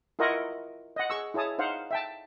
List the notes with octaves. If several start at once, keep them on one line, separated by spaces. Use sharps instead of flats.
E4 F4 A#4 D#5 F#5 C#6
D#5 F#5
G#4 C#6 E6
E4 G#4 C#5 A5 D#6
D#4 C5 F5 F#5
E5 G5 A5